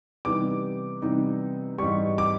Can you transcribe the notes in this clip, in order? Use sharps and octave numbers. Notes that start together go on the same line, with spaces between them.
C3 E3 G3 B3 D#4 D6
C3 E3 G3 B3 D#4
G#2 E3 G3 C#6
D6